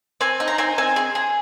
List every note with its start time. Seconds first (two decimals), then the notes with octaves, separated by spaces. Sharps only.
0.21 C4 G#5
0.40 D#4
0.48 A#5
0.58 C4 G#5
0.78 C4 G#5
0.96 G#4
1.15 G#4